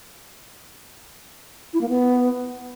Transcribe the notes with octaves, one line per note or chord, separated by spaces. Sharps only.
E4
A#3
B3